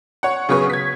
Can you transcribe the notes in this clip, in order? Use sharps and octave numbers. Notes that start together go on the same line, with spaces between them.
C#5 F#5
C#3 F#3 G#4 B4 C#6
G#6 B6